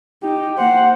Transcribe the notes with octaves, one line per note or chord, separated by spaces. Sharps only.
D#4 G4
A#3 C5 F#5